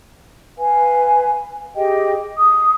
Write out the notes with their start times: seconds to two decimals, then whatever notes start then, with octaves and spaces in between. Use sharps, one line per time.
0.58 B4 F5 G#5
1.75 G4 G#4 D#5 G5
2.36 D#6